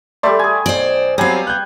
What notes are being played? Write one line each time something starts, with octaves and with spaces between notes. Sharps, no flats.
G3 A3 D5 E5 C6
G#4 G#5
B1 C5 D5
F#3 G3 B3 C4 F5 G#5
F#6 G6